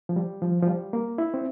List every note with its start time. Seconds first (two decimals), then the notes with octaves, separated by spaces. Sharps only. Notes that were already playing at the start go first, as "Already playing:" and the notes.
0.09 F3
0.16 G3
0.42 F3
0.63 F3
0.67 G3
0.93 A#3
1.18 E4
1.34 C4